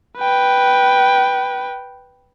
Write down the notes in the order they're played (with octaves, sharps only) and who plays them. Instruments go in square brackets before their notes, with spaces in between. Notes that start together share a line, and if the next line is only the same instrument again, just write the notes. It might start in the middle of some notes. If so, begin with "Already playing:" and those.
[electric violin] B4 G5